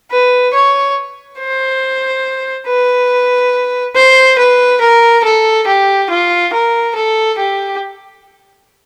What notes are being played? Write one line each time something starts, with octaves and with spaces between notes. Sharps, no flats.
B4
C#5
C5
B4
C5
B4
A#4
A4
G4
F4
A#4
A4
G4